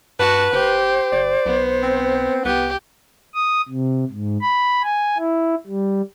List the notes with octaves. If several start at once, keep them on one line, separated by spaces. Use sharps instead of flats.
G2 F#4 B4 A5
F#1 G4 C5
G1 D5
B1 B3
C4
C2 B3 G4
D#6
C3
G#2
B5
G#5
E4
G3